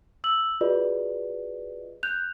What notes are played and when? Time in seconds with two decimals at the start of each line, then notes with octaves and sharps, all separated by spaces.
0.24 E6 F#7
0.61 F4 F#4 G#4 B4 D5 D#5
2.03 F#6 G6 F7